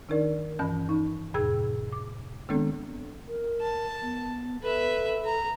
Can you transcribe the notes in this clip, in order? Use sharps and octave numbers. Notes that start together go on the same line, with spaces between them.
D#3 D4 D#4 A#4 D5
G2 E3 C#4 G6
D#4
F2 A2 C3 G#4 E6 G#6
D6
D#3 G#3 B3 C4 D4 A4
A#4
A5
B3
A4 B4 E5
A#5